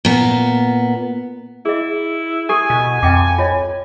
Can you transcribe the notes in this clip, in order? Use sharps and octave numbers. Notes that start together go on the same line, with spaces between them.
A#2 B3
E4 G#4 D#5
G4 A4 G#5
B2
F2 D#5 G5 D6
F4 C#5 D#5